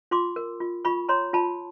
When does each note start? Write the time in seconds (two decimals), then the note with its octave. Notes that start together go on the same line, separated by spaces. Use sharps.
0.11 F4 C6 D6
0.36 A#4
0.60 F4
0.85 F4 B5 C#6
1.09 C#5 A#5 C6
1.33 F4 A5 B5